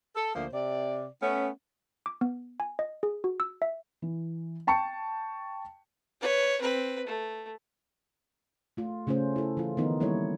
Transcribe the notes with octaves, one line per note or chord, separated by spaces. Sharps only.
A4
D2 F3 A#3 C5
C3 D5
A3 B3 C#4
D6
B3
G#5
D#5
G#4
F#4
E6
E5
E3
G5 A5 C#6 C#7
B4 C#5
C4 B4
A3
A3 F4
C#3 A3 C#4 F4 C5
E4 A4
E3 F4
D#3 F3 B3 D#4
E3 G3 A#3 E4 A4 C#5